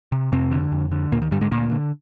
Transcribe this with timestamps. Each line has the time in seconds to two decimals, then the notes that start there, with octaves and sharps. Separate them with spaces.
0.12 C3
0.32 F2 C3 C4
0.52 D3
0.72 F2
0.91 D3
1.12 D2 A#2 A#3
1.22 D#3
1.31 G2 D3 G3
1.41 G#2 G#3
1.51 D2 A#2 A#3
1.71 D3